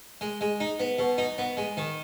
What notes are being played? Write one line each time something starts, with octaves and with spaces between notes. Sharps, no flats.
G#3
G#3
D#4
B3
B2
D#4
B3
G#3
D#3